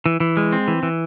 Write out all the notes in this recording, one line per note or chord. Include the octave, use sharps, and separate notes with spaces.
E3
E3
G#3
C4
E3
E3